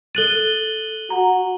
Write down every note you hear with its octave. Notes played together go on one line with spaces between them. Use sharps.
A4 F#6 A6 D#7 F#7 G7
F#4 A#5